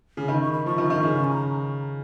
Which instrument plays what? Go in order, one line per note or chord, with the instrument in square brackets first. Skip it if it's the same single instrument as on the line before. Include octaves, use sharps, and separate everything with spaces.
[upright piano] C#3
[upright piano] D#3 [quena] B5
[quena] C#6
B5
[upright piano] F3 [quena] C#6
[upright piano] D#3
D#3
C#3
[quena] G#5
A#5